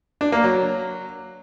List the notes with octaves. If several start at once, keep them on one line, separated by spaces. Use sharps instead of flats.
D4
A#3
F#3